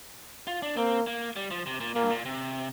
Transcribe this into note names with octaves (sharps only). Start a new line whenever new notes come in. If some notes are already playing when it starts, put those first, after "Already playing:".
F4
D4
A#3 C4
A#3
G3
F3
C3
A#2
A#2 A#3
G2
A#2
C3